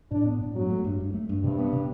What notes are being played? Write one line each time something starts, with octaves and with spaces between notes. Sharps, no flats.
A2 D4
B3
A2
G2 F#3
A3
G2
G2
A3
G2
G2 C3
B3
C3